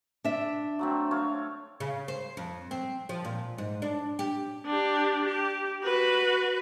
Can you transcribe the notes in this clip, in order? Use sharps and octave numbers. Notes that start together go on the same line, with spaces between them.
D4 E5
F#3 A3 C4
A3 C#5 F5
C#3
C5
F2
C4
F3
A#2
G#2
D4
G4
D4 G4
G4
F#4 B4